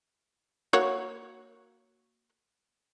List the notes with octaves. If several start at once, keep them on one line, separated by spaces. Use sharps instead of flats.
A#3 F#4 C#5